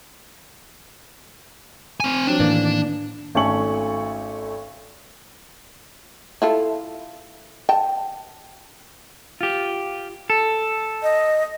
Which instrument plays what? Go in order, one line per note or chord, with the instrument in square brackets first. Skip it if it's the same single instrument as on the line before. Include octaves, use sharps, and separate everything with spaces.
[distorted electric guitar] C4 G#5
[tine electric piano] F3 F#3 C4 [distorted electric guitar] D4
[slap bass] A2 E3 [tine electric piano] D#3 A#3 D5
[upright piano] G#1 A3 C#4 A4 C#6 F#7
[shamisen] E4 F4 A4
G5 A5
[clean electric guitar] F4 G4
A4
[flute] D#5